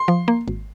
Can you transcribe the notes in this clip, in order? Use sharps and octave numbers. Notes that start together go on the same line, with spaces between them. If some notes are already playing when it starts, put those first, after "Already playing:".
Already playing: C6
F3
A#3
G#1